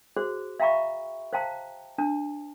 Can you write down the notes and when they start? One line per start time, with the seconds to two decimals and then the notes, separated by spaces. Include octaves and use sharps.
0.17 F#4 G#4 C5
0.60 E5 F5 G5 A#5 B5 C#6
1.33 C5 F5 G5 A5 A#5
1.98 D4 A5